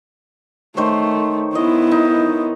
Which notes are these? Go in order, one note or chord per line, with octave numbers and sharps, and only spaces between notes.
D#3 A3 C5 C#5
B3 E4 D#5
D#4